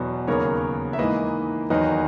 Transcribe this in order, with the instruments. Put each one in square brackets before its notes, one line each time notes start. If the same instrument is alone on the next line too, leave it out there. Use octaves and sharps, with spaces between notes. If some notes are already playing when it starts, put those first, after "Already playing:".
Already playing: [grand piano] E2 B2 F#3 B3
D#2 C#3 F#3 B3 A#4 C#5
E5
G#2 E3 A#3 B4 D#5
E2 D#3 F#3 B4 D#5